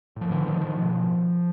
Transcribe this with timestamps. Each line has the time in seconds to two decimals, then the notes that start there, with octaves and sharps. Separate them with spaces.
0.16 A2 F3
0.31 D3 E3
0.46 A2 D#3 F3
0.61 D#3 F3
0.77 B2